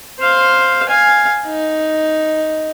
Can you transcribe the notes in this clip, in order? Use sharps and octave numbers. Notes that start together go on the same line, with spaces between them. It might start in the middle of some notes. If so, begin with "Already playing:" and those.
C5 F5
F5 G#5
D#4